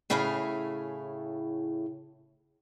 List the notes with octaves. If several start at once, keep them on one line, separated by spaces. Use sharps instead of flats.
A2 C#3 E4 G#4 A4 F5